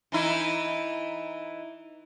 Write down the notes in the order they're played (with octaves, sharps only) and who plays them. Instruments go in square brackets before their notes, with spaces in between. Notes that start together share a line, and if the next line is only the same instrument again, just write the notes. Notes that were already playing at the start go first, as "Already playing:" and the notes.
[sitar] E3 D#4 E4